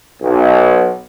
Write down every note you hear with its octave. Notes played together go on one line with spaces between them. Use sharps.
B1